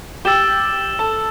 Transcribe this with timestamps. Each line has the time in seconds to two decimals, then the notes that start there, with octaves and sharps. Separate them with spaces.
0.25 G4 G5 E6 A6 E7 G7
0.99 A4 A5